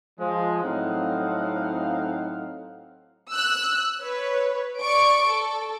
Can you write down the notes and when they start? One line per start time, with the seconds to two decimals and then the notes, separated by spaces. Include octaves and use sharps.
0.19 F3 G#3
0.64 A2 F#3 C4 D#4 F5 F#5
3.30 E6 F#6
4.01 B4 C#5
4.80 D5 C#6 D7
5.26 A4